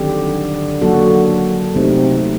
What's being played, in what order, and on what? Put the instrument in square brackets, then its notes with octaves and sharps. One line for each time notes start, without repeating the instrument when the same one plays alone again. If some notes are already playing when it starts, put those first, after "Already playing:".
Already playing: [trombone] D3 [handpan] D#3 F#3 C4 G4
[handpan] F#3 A#3 F#4 A4
[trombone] C3 [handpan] A3 C4 D#4